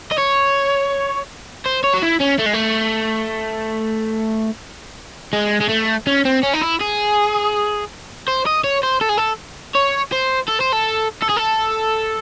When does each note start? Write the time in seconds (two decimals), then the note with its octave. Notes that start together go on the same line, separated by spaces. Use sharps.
0.11 D#5
0.18 C#5
1.66 C5
1.84 C#5
1.94 F#4
2.03 E4
2.21 C#4
2.39 A3
2.46 G#3
2.54 A3
5.33 G#3
5.61 G#3
5.69 A3
6.07 C#4
6.25 C4
6.43 C#4
6.53 D#4
6.62 E4
6.81 G#4
8.28 C5
8.46 D#5
8.64 C#5
8.83 C5
9.01 A4
9.09 G#4
9.18 A4
9.75 C#5
10.12 C5
10.48 A4
10.60 C5
10.72 A4
11.22 A4
11.29 G#4
11.36 A4